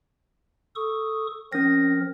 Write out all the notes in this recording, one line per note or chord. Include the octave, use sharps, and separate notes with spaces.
A4 C#6 D#6
F3 C4 C#4 A#4 A#6